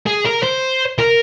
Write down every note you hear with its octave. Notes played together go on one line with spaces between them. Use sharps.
G#4
A#4
C5
A#4